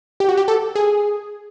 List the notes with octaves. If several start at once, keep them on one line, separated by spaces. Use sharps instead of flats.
G4
F#4
G4
A4
G#4